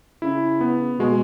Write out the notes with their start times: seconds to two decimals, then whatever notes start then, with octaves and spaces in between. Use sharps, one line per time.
0.22 C#3 E4
0.61 B3
0.99 B2 G#3